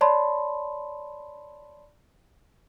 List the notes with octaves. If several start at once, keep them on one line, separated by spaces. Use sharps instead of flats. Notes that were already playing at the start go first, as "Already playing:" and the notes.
C#5 D5 A5 B5 C6